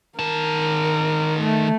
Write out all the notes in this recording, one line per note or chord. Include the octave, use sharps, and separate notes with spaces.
D#3 A#4 A5
A3